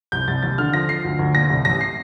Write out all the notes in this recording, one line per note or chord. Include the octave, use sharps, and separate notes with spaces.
C2 G6
C2 A6
D#2 A6
D3 F6
F3 A#6
F3 C7
D2
D2
A#2 A#6
C2
A1 A#6
C7